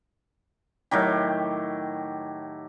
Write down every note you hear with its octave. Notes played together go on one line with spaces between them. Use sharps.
A2 D#3 F#3 G4